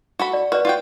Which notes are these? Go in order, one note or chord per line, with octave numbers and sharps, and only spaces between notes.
F#4 A4 B5
D5
F#4 B4 D5
F4 F#4 G5